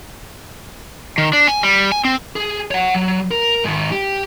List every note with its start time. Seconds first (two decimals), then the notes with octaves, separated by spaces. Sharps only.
1.18 D#3
1.33 D4
1.48 G#5
1.63 G3
1.92 G#5
2.05 C4
2.36 G#4
2.71 C#5 F#5
2.94 F#3
3.31 A#4
3.64 G#2 D#3
3.92 G4